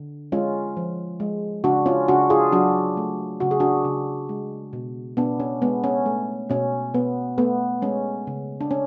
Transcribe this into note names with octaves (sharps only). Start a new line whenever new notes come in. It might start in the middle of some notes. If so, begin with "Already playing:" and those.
Already playing: D3
G#3 C#4 F4
F3
G#3
C#3 D4 F#4
C#4 F4
C#3 D4 F#4
F4 G#4
F#3 D4 F#4
A3
C#3 F#4
G#4
D4 F#4
C#3
G#3
B2
B2 B3 D4
C#4
G#3 B3
C#4
A3
B2 C#4
B2 B3
A3 B3
G#3 C#4
C#3
D4
C#4